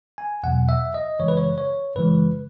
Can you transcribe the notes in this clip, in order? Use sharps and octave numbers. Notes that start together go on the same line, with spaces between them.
G#5
E2 B2 F#3 F#5
E5
D#5
F#2 C#3 E3 G#3 C#5
B4
C#5
C#5
F#2 C#3 E3 G#3 B4